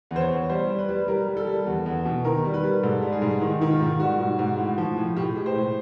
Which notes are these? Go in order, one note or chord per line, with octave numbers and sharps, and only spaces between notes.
E2
C5
C#5
E2
G3 C5
G3
B4
G3
G3 A#4
G3
A4
G3
E2
E2
B2
D#3 A#4
G3
B4
G3
G#2 A4
G3
G#4
G#2
D#3
D#3
F4
G#2
G3 F#4
G#2
G#2
A2
F3
A2
A2 G4
G#3
C5
A2